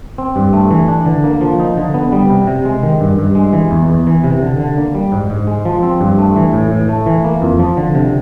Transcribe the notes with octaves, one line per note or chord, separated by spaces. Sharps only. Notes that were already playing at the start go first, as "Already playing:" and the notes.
C4
G2
A3
E3
D4
D3
A#3
F3
D#4
D3
B3
G3
C3
C3
G#3
D#3
G2
G2
G#3
E3
E2
E2
E3
C3
D3
D3
A#3
G3
G#2
G#2
G#3
F3
C4
G2
A3
E3
A2
A2
A3
E3
A#3
F2
F3
D3
C3